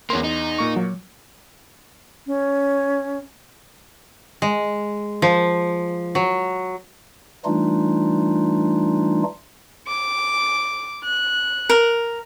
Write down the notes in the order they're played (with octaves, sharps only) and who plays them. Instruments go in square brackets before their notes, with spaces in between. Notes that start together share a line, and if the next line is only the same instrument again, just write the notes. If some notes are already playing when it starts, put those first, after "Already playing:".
[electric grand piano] E2 C6 [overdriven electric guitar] A#3 C#4
[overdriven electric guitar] D#4
[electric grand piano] A#2 A#3 C#6
[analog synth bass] F#3
[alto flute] C#4
[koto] G#3
F3
F#3
[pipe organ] E3 G3 A3 D4 D#4 F4
[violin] D6
F#6
[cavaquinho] A#4